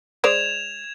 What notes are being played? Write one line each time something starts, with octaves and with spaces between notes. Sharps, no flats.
G#3 C5 D5 G#6 E7 F7